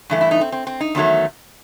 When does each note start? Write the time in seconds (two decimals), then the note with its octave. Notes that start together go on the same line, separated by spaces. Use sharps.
0.10 G2 E3 A3
0.21 E4
0.31 D#4
0.41 C4
0.52 C4
0.67 C4
0.80 D#4
0.95 E2 D#3 F#3 A3